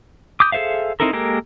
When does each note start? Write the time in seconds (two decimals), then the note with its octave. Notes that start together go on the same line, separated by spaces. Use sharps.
0.40 D6 D#6 G6
0.52 G#4 A4 C5 E5 F5
1.00 C4 D#4 E4 A4 A#4
1.13 G#3 A#3 G4 A4 A#4